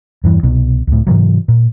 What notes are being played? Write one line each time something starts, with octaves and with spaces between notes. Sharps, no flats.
E2 G2 E3
C2 B2
C#2 A2
G#2 C3 E3 F#3
A#2